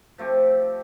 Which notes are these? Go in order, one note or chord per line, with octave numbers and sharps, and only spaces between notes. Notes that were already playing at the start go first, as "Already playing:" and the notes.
F3 A3 C4 G4